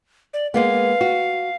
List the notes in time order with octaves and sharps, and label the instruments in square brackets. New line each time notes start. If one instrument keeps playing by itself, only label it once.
[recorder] D5
[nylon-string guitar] G#3 A#3 B3 [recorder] F5
[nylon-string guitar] F#4